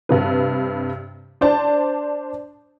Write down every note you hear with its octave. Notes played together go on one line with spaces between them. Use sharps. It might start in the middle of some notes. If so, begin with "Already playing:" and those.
G2 C3 B4
D4 C5 D5 A5